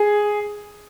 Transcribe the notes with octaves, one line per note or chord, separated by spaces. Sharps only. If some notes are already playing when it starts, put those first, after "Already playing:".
Already playing: G#4